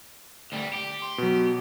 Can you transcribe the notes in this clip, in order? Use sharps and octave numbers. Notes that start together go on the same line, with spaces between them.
D2 G3
G4
C6
B2 F#3